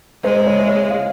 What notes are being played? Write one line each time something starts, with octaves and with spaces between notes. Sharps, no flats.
G#3 C5
C#5
E5
C#5
F5